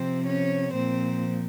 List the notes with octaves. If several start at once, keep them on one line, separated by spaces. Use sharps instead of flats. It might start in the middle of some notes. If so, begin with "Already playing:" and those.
Already playing: C3 F3 C4 C5
C#4 C#5
A#2 F3 C4 C5